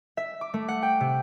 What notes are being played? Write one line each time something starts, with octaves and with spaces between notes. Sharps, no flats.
E5
D6
A3
F#5
G5
C3